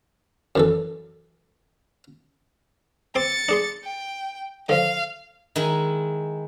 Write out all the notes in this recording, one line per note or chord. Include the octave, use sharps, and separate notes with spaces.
F#2 E3 A4
C4 C6 D6 A6 C#7
D4 G#4 C6
G5
D3 F3 F5
D#3 G#3 E4 G#5